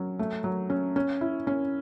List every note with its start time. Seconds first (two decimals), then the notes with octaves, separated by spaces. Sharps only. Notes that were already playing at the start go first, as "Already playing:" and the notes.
Already playing: F#3 C#4
0.19 A3
0.44 F#3
0.70 C#4
0.96 C#4
1.21 E4
1.47 C#4